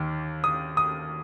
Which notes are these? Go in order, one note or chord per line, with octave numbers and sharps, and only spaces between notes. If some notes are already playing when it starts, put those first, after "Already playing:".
Already playing: D#2 D#3 A#3
D#6
D#6